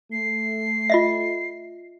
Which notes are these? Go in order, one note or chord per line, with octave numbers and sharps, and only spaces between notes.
A3 C7
F4 D#5 E5